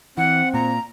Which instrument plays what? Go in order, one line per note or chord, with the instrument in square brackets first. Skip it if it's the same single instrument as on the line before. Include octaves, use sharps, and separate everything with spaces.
[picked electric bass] E3 [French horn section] C4 [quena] F#5
[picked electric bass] A#2 [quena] A#5